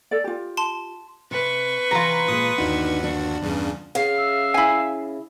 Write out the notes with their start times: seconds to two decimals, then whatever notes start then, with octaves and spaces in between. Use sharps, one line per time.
0.11 A4 D5
0.24 F4 G4
0.57 A5 C6
1.31 C3 B4 C#6
1.91 C3 D#3 E3 F4 A#5
2.28 A#2 G#3 D#6
2.58 G1 D#2 D4 D#4 F#4
3.04 D4
3.42 E2 G2 C#3
3.95 C#3 F5
4.17 E5
4.54 E4 G#5